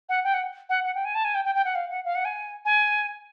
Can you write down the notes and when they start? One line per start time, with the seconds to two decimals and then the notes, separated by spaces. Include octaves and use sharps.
0.09 F#5
0.24 G5
0.34 F#5
0.69 F#5
0.84 F#5
0.95 G5
1.05 G#5
1.15 A5
1.25 G#5
1.35 G5
1.45 G5
1.55 G5
1.65 F#5
1.75 F5
1.90 F#5
2.05 F5
2.15 F#5
2.25 G#5
2.65 G#5